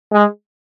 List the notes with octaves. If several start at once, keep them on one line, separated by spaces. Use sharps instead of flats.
G#3